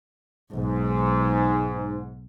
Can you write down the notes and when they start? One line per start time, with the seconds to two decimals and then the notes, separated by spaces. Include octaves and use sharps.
0.51 B1 G#2